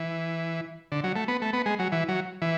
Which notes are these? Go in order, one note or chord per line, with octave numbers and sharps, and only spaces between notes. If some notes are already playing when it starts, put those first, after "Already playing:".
Already playing: E3
D3
F#3
A3
B3
A3
B3
G#3
F#3
E3
F#3
E3